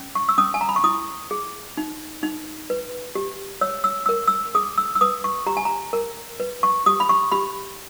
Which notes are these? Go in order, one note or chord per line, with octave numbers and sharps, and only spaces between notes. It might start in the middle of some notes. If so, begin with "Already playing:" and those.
Already playing: C#4
C#6
E6
C#4 D#6
G#5
A#5
B5
C#6
E4 D#6
G#4
D#4
D#4
B4
G4
C#5 E6
E6
A#4 E6
E6
G#4 D#6
E6
E6
B4 D#6
C#6
G4 A#5
G#5
A#5
A#4
B4
C#6
G4 D#6
B5
C#6
G4 B5